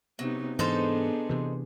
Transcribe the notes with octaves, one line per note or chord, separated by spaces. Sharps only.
C3 F#3 B3 D#4
G#2 E3 B3 D4 D#4 G#4 A4 C5
C3 E3